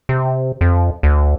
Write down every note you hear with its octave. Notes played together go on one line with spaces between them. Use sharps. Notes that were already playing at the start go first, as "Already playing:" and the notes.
C3
F2
D2